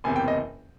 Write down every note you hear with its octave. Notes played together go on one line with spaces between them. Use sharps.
F#1 E2 C3 G#5
G5
D#5